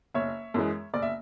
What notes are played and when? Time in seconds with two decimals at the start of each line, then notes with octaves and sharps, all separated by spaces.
0.14 F#1 C#5 E5
0.54 F#2 E3 G#3
0.94 F#1 D5
1.02 E5